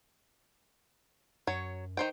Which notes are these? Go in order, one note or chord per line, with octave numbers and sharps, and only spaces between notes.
F#2 F#3 C#5
D#3 C5 G5